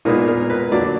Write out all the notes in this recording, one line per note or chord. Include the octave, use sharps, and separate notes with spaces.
A#2 G#3 B3 D#4 A#4
A#4
B4
D3 F#3 A#3 D4 D5